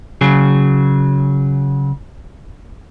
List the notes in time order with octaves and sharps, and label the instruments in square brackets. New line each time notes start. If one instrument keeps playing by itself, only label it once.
[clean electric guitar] C#3 F#3 G#4